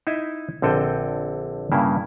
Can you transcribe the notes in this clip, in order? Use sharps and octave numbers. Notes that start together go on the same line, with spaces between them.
D#4 E4 D#5 E5
A#1 D3 C4 A4 D#5 G5
G2 C#3 A#3 E4